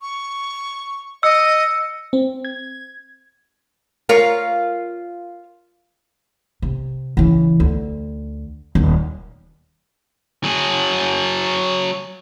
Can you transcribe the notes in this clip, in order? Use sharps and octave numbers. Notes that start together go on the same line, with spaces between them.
C#6
D#5 E6 C#7
C4
G#6
F4 A#4 C#5
C3
C#3 E3
D2
D#1 D#2
F#3 G#4